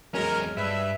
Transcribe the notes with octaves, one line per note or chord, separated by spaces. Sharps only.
E2 F#3 G#3 C#4 A#4 F6
G2 B4 E5